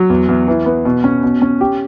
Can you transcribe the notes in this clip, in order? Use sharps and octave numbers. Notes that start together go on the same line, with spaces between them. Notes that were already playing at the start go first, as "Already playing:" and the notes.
Already playing: F#3
E2
E2
E3
B3
B2
C#4
B2
C#4
G4